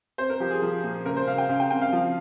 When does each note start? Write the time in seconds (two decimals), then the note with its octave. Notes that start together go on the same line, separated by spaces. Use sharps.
0.18 C4 C5
0.30 A#4
0.40 F3 G4
0.51 G#4
0.62 F3
0.83 A#2
1.05 C#3 A#4
1.17 C5
1.27 C#3 F5
1.38 G5
1.49 C#3 F5
1.60 G5
1.71 C4 G5
1.82 F5
1.92 F3